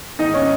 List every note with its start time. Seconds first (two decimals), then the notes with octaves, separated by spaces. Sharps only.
0.19 G#2 D#3 G#3 D#4 D#5
0.34 C#4 C#5